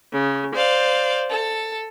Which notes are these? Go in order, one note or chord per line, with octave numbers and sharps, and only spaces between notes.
C#3
C5 D5 F5
A4